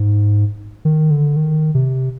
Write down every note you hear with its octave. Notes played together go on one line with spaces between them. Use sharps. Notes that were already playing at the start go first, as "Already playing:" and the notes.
Already playing: G#2
D#3
D3
D#3
C3